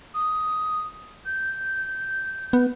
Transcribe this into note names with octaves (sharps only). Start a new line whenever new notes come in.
D#6
G6
B3